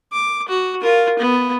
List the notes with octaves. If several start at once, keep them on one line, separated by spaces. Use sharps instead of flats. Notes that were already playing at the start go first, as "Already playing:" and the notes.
D6
F#4
F4 A#4
B3